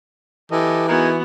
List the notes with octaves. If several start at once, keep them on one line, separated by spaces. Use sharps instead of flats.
E3 G4 A4 D#5
B3 D#4 F#4 G#4 A#4